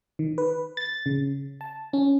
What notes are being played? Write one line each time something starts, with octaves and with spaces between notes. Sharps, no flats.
D#3
B4
A6
C#3
A5
C#4